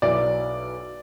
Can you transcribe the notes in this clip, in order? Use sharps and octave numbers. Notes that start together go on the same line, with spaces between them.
B1 B2 F#3 B3 E4 D5